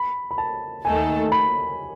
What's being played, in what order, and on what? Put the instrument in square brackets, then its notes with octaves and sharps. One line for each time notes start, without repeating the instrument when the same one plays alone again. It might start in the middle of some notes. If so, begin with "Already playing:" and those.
Already playing: [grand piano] B5
B5
A5
[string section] D#2 D#3 A3 D#4 A4 [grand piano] G#5
[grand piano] B5